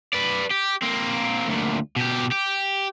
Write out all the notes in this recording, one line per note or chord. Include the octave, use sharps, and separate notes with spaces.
B4 D5
G4
A#3 C4
D2 A#2
B2 G4
G4